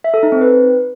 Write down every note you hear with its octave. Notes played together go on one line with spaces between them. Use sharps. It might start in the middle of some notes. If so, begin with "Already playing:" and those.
E5
A4
D#4
C4
B4